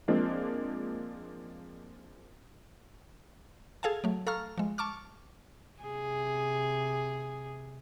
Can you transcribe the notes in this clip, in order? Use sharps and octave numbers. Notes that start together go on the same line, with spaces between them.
F3 G#3 A#3 C4 D4
G#4 A4 F5 G#5 A5
F#3 A3
A4 F5 A#5 C#6 F6
F3 G#3
A5 C#6 D6 F6
C3 G#4